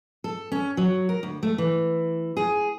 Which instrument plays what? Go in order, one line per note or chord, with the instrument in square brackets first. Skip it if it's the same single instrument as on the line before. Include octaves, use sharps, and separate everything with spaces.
[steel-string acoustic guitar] A4
C#4
F#3
A#4
D2
A3
E3
G#4